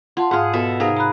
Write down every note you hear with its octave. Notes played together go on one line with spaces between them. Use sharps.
F4 F#5 A5 C6
G#2 F4 G#4 F5 F#5
B2 A4 E5
C3 D#4 G#4 A#4 F5
A#5 B5 F#6